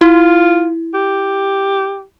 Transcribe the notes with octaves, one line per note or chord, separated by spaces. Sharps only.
E4 F4
G4